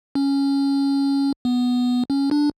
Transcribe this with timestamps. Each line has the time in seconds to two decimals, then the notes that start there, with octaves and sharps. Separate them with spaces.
0.15 C#4
1.45 B3
2.10 C#4
2.31 D4